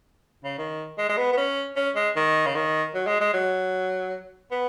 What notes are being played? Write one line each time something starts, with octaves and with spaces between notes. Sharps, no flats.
C#3
D#3
G#3
G#3
B3
B3
C#4
C#4
G#3
D#3
C#3
D#3
F#3
G#3
G#3
F#3
B3